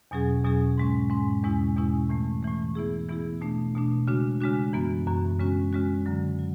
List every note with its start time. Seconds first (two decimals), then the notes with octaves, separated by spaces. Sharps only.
0.11 E2 B2 F#3 C#4 G#4
0.44 E2 B2 F#3 C#4 G#4
0.78 G#2 G#3 C#4
1.10 G#2 G#3 C#4
1.43 E2 B2 G#3 C#4 E4
1.76 E2 B2 G#3 C#4 E4
2.09 A2 E3 A3
2.42 A2 E3 A3
2.75 E3 B3 E4 G#4
3.08 E3 B3 E4 G#4
3.41 B2 A3 D4
3.75 B2 A3 D4
4.07 C#3 G#3 D4 F#4
4.40 C#3 G#3 D4 F#4
4.73 F#2 E3 B3 F#4
5.07 F#2 E3 B3 F#4
5.39 C#3 G#3 C#4 F#4
5.73 C#3 G#3 C#4 F#4
6.06 F#2 D3 F#3
6.39 F#3